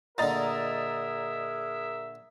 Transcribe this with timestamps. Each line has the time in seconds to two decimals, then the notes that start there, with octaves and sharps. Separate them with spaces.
0.18 A#2 D3 G#4 A#4 D#5 E5 A#5 A6